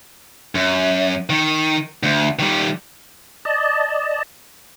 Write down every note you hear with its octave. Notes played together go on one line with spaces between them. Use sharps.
F#2
D#3
D2
D#3 G3
D5 D#5 A5